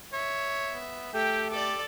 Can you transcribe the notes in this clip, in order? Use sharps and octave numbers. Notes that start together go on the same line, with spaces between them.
C#5 E5
B3
A3 G4 G5
G4 A4 D5 D6